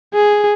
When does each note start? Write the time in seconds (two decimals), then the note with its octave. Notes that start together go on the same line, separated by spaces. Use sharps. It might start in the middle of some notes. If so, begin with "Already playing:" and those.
0.14 G#4